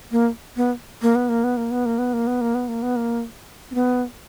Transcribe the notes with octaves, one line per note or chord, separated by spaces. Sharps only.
A#3
B3
A#3
B3
A#3
B3
A#3
B3
A#3
B3
A#3
B3
A#3
B3
A#3
B3
A#3
C4
B3